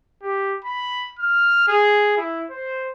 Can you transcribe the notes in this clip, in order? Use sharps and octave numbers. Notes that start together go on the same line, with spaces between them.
G4
B5
F6
G#4
E4
C5